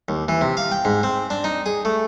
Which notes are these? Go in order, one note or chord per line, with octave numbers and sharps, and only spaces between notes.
D#2
E3
C3
F5
G5
G#2
C4
D4
D#4
G#4
A3